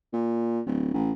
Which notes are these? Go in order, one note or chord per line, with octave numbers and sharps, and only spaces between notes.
A#2
D1
A1